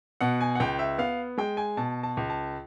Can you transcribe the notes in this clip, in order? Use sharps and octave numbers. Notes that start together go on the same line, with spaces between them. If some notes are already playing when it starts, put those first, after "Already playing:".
B2 F#5
G#5
F#5
C#2 G5
E5
B3 F5
G#3 G5
G#5
B2 A5
A5
C#2
A5